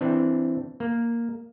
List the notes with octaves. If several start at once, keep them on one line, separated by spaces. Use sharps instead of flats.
E3 C4 D4
A#3